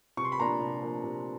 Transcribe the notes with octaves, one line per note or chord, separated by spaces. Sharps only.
C3 C#6
C6
B5
F3 A#3 D4 A#5 C6
C3
F3 A#3 D4
C3